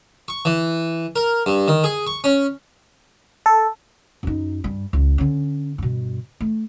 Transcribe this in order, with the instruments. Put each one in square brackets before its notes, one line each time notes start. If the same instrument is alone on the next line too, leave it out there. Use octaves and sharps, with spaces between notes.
[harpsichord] C#6
E3
A#4
G2
D#3
G#4
C#6
C#4
[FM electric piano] A4
[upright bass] F#2 D#4
G2 G3
C#2
D3 C#4
G2 B2
A3